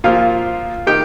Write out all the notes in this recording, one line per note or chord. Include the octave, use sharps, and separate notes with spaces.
A#2 F3 F4 F5
D#3 G4 G5